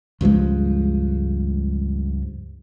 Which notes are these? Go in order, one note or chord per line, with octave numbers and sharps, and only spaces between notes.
C#2 G2 F3 G#3